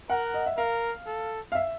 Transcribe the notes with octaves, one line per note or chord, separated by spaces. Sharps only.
A#4 F#5
D#5
E5
A#4 F5
A4
F5
E5